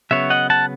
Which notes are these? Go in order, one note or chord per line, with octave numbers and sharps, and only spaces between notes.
C#3 F#3 B3 C#5 E5
D#5 F#5
F#5 A5